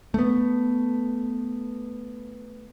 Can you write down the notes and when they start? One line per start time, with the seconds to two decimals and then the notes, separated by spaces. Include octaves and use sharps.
0.14 A3 B3